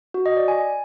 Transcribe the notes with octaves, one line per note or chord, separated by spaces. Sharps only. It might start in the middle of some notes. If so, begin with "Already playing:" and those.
F#4
D#5
D5
G#5